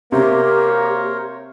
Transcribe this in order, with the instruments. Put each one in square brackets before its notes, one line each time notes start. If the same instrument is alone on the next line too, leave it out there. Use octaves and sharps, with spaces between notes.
[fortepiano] C3 [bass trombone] A#3 [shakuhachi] G4 [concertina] A#4 C5 C#5